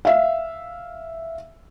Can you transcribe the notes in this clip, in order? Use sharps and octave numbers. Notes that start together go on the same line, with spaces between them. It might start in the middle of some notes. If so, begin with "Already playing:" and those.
E5 F5